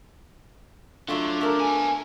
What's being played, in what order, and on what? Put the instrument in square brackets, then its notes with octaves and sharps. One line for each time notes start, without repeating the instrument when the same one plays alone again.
[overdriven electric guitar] D3 [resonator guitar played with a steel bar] F#3 A3 F4
[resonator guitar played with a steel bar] A3 A#4
[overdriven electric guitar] B3 G#5